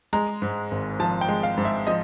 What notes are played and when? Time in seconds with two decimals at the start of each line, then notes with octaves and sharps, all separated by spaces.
0.13 G#3 A#5
0.42 G#2
0.71 G#1
1.00 F3 A5
1.21 G5
1.28 G#3
1.43 F5
1.57 G#2
1.65 E5
1.87 F3 D#5